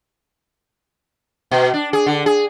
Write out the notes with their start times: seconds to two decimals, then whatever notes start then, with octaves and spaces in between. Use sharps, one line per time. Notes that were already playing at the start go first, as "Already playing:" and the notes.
1.51 B2
1.74 D4
1.93 G#4
2.06 D3
2.26 G#4